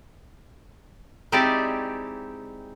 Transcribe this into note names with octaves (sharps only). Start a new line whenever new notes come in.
G#3 C4 D#4 E4 G4 D5